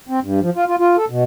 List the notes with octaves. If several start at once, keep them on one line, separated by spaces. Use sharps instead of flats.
C4
G2
F3
F4
F4
F4
A4
B2